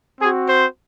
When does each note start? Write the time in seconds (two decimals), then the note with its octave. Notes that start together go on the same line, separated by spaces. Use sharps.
0.21 C4 F#4 G#4
0.49 C5